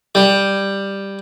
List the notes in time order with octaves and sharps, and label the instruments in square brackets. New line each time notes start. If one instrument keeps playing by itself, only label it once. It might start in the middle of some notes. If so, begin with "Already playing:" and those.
[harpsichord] G3